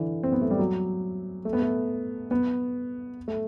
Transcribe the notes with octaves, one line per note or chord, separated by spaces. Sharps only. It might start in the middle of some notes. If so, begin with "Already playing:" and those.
Already playing: D3 E3
C4
B3
A3
G3
F#3
A3
B3
A3
B3
A3